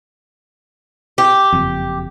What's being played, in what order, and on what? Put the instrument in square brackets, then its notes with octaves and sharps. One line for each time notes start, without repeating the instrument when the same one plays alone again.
[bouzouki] G4
[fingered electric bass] F#1 F2